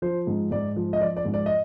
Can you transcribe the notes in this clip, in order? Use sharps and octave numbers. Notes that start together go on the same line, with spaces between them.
F3 C5
G#2
G#2 D5
F3
D#5
F3 D5
D5
G#2
D5
D#5